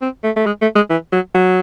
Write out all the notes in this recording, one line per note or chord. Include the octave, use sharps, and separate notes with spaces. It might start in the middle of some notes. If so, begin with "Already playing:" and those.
C4
A3
A3
G#3
A3
G#3
E3
F#3
F#3